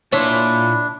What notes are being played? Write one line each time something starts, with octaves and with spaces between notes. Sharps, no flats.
A#2 D4 E4 C#5 C6